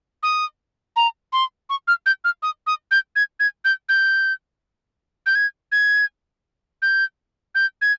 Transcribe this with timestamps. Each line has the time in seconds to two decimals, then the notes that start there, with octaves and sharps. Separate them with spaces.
0.23 D#6
0.96 A#5
1.33 C6
1.70 C#6
1.88 F6
2.06 G6
2.24 F6
2.43 D#6
2.67 D#6
2.91 G6
3.16 G#6
3.40 G#6
3.65 G6
3.89 G6
5.26 G6
5.35 G#6
5.72 G#6
6.82 G6
7.55 G6
7.82 G#6